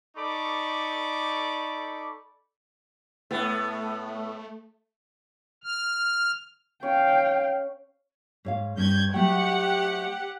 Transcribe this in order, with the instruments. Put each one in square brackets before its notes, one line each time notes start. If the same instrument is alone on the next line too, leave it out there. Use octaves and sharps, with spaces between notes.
[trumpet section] D#4 A4 D5 B5 C#6 D6
[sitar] A2 B3 [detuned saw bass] A3
[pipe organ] F6
[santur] C#4 [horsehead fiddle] F5 G5
[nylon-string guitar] G#2 C#5 F5
[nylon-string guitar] G2 C#4 [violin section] G6 G#6
[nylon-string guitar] F#3 A3 G5 [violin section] G4 F#5